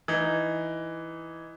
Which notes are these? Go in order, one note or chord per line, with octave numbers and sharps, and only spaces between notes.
E3 D#4